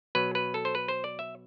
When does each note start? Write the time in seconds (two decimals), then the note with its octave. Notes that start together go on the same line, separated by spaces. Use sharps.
0.15 B2 F#3 B4
0.35 B4
0.54 A4
0.65 C5
0.75 B4
0.88 C5
1.04 D5
1.19 E5